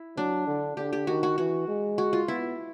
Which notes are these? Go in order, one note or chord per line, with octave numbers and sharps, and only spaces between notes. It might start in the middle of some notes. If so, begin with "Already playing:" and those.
Already playing: E4
F#3 D4
D3
D3 G4
G4
D#3 F#4
F#4
E3 F#4
G#3
F#4
F4
B3 E4